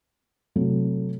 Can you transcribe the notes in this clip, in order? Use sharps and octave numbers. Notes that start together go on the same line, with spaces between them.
C3 F#3 A3